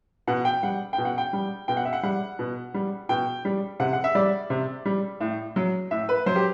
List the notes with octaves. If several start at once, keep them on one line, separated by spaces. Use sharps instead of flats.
B2 F#5
G5
G3 F#5
G5
B2
F#5
G5
G3
B2 G5
F#5
E5
F#5
G3 F#5
B2
G3
B2 G5
G3
C3 F#5
F#5
E5
G3 D5
C3
G3
A2
F#3
A2 E5
B4
F#3 C5
G4